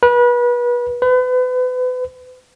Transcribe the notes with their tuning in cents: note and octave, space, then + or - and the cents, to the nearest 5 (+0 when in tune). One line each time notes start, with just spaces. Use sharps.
B4 -30
B4 +35